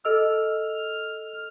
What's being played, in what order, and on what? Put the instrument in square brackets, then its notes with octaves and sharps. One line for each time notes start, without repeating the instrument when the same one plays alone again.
[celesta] A4 D#5 E6 [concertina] F6